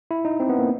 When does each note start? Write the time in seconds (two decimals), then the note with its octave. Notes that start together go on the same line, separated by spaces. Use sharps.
0.11 E4
0.25 D#4
0.40 C4
0.49 B3
0.59 A#3